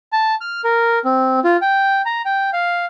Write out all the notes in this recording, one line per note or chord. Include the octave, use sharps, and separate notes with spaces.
A5
F6
A#4
C4
F4
G5
A#5
G5
F5